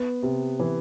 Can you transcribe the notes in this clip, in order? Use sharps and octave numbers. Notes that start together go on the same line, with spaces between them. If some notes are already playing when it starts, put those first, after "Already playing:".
Already playing: B3
C3
E3